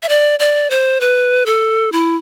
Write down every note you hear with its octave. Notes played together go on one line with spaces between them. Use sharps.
E5
D5
D5
C5
B4
A4
E4